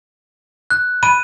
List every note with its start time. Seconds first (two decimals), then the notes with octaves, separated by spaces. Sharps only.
0.70 F#6
1.03 B5 D#7